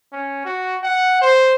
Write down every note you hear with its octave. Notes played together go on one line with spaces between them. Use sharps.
C#4
F#4
F#5
C5